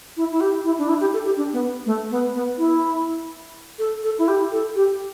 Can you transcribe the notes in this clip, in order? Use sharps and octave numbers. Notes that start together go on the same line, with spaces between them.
E4
E4
G4
E4
D4
E4
G4
A4
G4
D4
B3
A3
B3
B3
E4
A4
A4
E4
G4
A4
G4